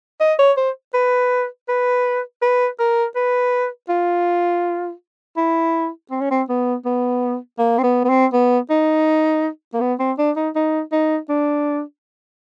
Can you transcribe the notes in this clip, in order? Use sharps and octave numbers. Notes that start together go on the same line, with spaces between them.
D#5
C#5
C5
B4
B4
B4
A#4
B4
F4
E4
C4
C#4
C4
B3
B3
A#3
C4
B3
B3
C4
B3
D#4
A#3
B3
C4
D4
D#4
D#4
D#4
D4